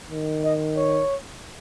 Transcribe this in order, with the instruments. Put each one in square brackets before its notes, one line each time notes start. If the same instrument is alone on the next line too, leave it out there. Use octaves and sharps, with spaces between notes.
[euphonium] D#3
[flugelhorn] D#5
C#5